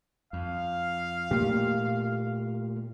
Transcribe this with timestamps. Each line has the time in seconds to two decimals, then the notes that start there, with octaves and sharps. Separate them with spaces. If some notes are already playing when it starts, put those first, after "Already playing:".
0.33 F2 F5
1.31 A#2 A3 A#3 G4